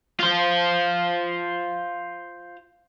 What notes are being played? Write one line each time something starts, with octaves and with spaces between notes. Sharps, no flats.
F4 C5